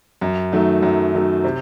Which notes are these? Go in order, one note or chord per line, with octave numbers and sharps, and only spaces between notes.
F#2
D#3 F#3 A3
F#2
D#3 F#3 A3
C3